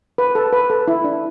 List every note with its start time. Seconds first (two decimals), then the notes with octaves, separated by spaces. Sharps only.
0.18 B4
0.35 A4
0.53 B4
0.70 A4
0.88 E4
1.04 D4